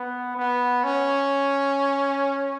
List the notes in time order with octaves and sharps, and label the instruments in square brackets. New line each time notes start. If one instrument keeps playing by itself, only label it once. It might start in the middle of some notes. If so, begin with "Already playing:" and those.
Already playing: [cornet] B3
B3
C#4